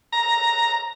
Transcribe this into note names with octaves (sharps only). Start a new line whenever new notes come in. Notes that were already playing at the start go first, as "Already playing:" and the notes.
A#5